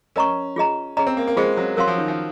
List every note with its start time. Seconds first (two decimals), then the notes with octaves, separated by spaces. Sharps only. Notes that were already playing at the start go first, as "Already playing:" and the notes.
0.16 C#4 A#4 D#5 A#5 C#6
0.56 F4 G#4 D#5 A#5
0.97 C#4 G#4 D#5 A#5
1.07 C4
1.17 A#3
1.27 A#3
1.37 G#3 F4 G#4 C5 D#5
1.57 F#3
1.77 F#3 A#4 F5 C6
1.88 F3
1.98 D#3
2.08 F3